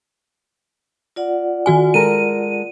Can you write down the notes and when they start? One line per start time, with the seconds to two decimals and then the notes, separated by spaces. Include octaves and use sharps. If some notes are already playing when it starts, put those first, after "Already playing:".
1.16 F4 D5 F#5
1.66 D#3 F#4 G#5
1.94 G#3 A4 A#4 D#7